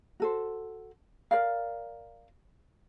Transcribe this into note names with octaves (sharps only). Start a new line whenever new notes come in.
F#4 A4 C5
A#4 D5 F5